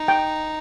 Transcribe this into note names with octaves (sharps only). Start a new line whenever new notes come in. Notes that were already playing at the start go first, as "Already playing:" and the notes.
Already playing: D#4
G5